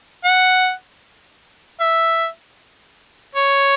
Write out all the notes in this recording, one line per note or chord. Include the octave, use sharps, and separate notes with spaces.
F#5
E5
C#5